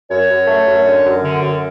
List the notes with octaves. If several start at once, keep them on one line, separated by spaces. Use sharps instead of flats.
F#2 C#5
F#2
A3
F#2
D3
F#2
D3
F#2